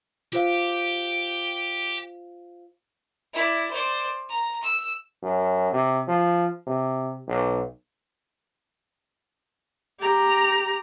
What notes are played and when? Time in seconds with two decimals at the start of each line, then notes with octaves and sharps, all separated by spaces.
0.33 F4 G4 C5 F5
3.33 E4 D5
3.70 C5 D5
4.29 A#5
4.63 E6
5.23 F#2
5.72 C3
6.08 F3
6.67 C3
7.28 B1
10.00 G4 A#5